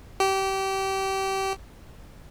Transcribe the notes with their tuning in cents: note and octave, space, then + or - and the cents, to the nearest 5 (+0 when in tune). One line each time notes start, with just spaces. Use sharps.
G4 -25